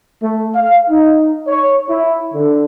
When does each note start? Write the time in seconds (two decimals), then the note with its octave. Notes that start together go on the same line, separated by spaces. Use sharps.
0.22 A3
0.55 F5
0.89 D#4
1.48 C#5
1.90 E4
2.34 D3